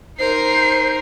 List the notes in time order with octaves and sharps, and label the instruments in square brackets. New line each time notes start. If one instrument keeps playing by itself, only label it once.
[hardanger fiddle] D#4 A#4 [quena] C5 [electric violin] C7